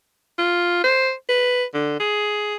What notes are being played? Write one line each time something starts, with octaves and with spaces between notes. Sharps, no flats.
F4
C5
B4
D3
G#4